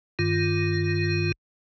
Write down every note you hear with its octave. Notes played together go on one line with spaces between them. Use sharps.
G2 D#3 F4